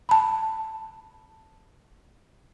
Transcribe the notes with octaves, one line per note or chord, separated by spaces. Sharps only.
A5 B5